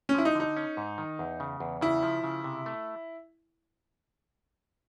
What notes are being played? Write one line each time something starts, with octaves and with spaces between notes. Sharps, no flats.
C#4
F3 E4
D#4
D3
D#4
C#4
G#2
D#3
E2
C#3
E2
C#3 E4
F3
C#3
C3
A3